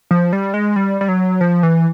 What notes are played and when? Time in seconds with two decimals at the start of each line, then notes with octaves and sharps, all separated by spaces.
0.11 F3
0.33 G3
0.54 G#3
0.76 G3
1.01 G3
1.09 F#3
1.41 F3
1.63 E3